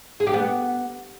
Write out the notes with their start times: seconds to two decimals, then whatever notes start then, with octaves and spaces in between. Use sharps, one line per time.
0.20 G#4
0.27 G4
0.33 B3